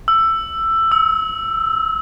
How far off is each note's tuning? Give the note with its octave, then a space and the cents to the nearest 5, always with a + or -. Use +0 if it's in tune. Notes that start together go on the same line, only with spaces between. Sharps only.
E6 +10
E6 -30